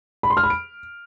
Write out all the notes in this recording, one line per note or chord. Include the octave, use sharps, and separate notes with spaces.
B5
C6
F6
B5
D7